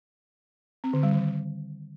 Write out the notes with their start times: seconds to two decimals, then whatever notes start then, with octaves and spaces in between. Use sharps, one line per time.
0.84 C4
0.93 D3
1.03 G3
1.13 D#3